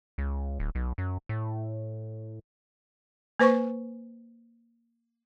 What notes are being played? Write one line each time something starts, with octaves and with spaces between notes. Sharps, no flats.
C#2
D1
B1
F#2
A2
A#3 B4 C5 G#5 C#6